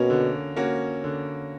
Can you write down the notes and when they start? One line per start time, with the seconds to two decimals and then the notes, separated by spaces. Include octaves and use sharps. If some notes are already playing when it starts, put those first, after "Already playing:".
Already playing: B2 A#3 C#4 F#4
0.10 D3
0.57 A#3 C#4 F#4
1.04 D3